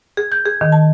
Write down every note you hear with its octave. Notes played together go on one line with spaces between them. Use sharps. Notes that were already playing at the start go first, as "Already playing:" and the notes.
G#4
G6
G#4
D#3
A5